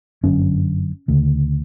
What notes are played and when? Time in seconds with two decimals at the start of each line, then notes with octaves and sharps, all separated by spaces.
0.23 G1 F#2 D3 C#4
1.08 D2 C#3